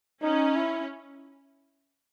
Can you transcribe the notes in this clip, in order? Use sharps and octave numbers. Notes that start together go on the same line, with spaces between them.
C#4 D#4
E4